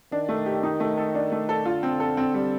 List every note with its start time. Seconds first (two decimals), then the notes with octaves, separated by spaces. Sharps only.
0.12 D#3 D4
0.29 A3
0.46 G4
0.63 D#4
0.80 A3
0.98 A4
1.15 D4
1.32 A3
1.49 A4
1.66 D3 F4
1.83 C4
2.00 A4
2.17 C4
2.34 G3